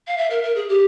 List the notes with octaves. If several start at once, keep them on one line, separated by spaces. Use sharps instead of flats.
F5
E5
A#4
A#4
G#4
G4